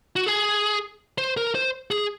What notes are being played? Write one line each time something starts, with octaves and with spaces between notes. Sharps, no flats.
F#4
G#4
C5
A#4
C5
G#4